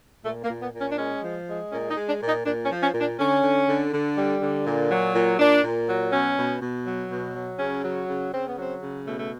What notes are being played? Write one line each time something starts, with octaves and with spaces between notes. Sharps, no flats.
A#2 A3
A#3
A#2
B3
A#2
C#4
D4
G#3 C#4
F3
G#3
A#2 C#4
D#4
G#3
D4
A#2
D#4
A#2 D4
C#4
F3
C#4
A#2
D4
D3 C#4
D3
D3
D3
G3
D3
A#2
F#3
A#2
A#2 D4
A#2
F#3
B2 C#4
B2
B2
F#3
B2
F#3
C#3 C#4
F#3
C#3
C#3 C4
B3
F#3 C4
C#3
B2 A3
A3